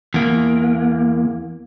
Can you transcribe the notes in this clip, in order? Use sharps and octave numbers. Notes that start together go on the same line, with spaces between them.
E2 A#3